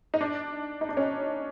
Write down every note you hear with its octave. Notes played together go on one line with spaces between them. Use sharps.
D#4
D4
D#4
D4
C#4